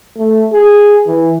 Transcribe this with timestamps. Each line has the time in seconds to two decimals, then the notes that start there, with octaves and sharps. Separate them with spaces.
0.18 A3
0.53 G#4
1.07 E3